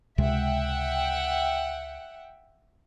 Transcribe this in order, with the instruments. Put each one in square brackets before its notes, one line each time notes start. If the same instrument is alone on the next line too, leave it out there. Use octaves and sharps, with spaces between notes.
[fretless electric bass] C#2 C3 G#3 [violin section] E5 F#5 G5